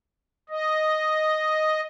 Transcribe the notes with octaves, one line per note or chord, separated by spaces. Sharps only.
D#5